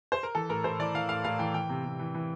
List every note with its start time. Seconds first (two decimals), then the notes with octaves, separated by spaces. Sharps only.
0.12 C5
0.23 A#4
0.35 E3 A4
0.49 A2 A#4
0.64 A2 C5
0.79 E3 D5
0.94 E3 F5
1.09 A2 F5
1.24 A2 F5
1.39 E3 G5
1.54 E3 G5
1.69 C3
1.84 C3
1.99 E3
2.14 E3